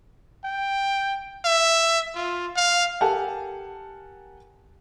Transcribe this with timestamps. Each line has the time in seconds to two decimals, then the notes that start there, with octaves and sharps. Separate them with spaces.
0.45 G5
1.45 E5
2.16 F4
2.56 F5
3.01 G4 A4 A#4 F#5 G#5 A5